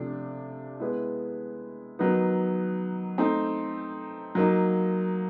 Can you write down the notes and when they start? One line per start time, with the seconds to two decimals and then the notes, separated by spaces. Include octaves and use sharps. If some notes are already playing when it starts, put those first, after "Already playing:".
Already playing: C3 F3 A3 D4
0.80 G#3 B3 E4
1.99 D#3 F#3 B3 D#4
3.18 A3 C4 D#4
4.35 F#3 A#3 D#4